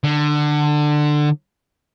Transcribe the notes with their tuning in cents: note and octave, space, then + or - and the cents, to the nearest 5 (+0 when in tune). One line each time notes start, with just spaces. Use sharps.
D3 +20